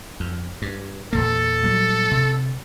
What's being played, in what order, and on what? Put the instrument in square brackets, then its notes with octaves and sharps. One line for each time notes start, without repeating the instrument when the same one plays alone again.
[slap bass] F2
G2
[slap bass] E2 A#2 A#3 [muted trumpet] A4
[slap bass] A#2 F#3 G3
C3